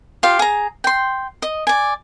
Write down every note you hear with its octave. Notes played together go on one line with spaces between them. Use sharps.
F4 G4 F5
G#4 A#5
G5 C6
D#5
D5 G#5